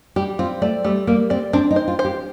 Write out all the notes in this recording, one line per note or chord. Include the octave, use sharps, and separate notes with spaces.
G3 G4
C4 F4
A3 D5
G3 A3
G3 A#3
C4 D5
C4 D4
D#4
C5
F4
C5
G4